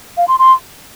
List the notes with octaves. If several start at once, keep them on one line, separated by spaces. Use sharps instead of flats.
F5
C6
C6